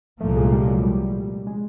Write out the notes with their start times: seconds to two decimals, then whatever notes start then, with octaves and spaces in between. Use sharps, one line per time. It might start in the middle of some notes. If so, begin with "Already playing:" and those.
0.20 C2 A#2 F3 A3 A#3
0.36 G#3
0.52 G3
0.68 F#3
0.83 G3
1.47 G#3